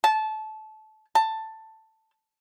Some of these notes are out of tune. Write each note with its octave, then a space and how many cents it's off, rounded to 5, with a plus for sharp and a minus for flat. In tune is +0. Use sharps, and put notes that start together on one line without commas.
A5 -20
A5 +10